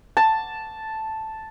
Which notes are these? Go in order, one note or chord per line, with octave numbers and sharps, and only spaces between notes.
A5